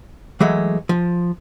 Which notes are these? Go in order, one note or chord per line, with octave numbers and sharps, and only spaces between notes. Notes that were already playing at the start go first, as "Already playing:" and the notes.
E3 F#3 G#3 A3
F3